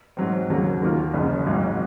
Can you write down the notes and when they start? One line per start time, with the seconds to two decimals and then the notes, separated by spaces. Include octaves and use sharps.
0.17 G#2 F#3 C4
0.50 D#2 C#3 F#3 A#3
0.82 D#2 D#3 A#3 F4
1.13 F#1 F#2 C#3
1.46 G#1 G#2 F#3